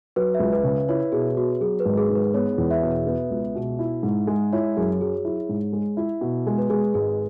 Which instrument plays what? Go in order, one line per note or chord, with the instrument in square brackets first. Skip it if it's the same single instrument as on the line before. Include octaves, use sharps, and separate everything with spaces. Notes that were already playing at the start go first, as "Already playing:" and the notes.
[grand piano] F#3 [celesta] B4
[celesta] E5
[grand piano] C#2
[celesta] B4
[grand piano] C#3
[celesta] B4
[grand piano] E4 [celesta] C#5
[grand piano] B2 [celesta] G#4
[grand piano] B3 [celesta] F#4
[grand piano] F#3 [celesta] G#4
[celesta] B4
[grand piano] G#1
[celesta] G#4
[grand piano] G#2
[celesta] B4
[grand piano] B3 [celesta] C#5
[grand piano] E2
[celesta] E5
[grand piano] B2
B3
C#2
B2
E4
G#2
G#3
[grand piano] E4 [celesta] C#5
[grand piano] F#2 [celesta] G#4
[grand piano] F#3 [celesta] G#4
[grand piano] E4
G#2
G#3
E4
B2
G#3
[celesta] B4
[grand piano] G#3 [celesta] G#4
[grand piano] G#1 [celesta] G#4